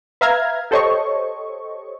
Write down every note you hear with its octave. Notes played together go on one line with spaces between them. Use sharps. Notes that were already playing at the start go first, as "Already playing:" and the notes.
B4 E5 F5 A#5 F6 G#6
G4 A4 C5 C#5 D#5 C#6